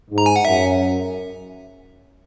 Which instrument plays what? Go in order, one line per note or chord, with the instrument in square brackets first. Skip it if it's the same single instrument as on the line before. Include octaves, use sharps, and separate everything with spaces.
[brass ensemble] G#2
[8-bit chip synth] A#5
G#5
F#5
[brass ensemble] F#2 [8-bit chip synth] E5